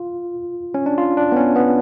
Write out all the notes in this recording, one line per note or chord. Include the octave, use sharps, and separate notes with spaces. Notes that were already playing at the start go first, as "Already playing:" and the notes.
Already playing: F4
C#4
D4
F4
D4
B3
C#4
B3